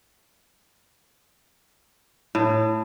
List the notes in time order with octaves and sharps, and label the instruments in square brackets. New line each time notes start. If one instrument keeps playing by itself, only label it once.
[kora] A2